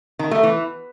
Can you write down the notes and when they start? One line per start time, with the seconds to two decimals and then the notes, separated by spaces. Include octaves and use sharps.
0.19 D#3
0.31 A3
0.43 E3